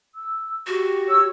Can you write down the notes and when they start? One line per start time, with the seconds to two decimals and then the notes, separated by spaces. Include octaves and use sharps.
0.15 E6
0.67 F#4 G4
1.08 C#5 E6